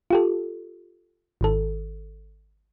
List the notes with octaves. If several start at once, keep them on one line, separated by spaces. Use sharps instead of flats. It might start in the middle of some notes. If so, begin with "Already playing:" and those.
F4 G4 A4
G#1 D#3 A4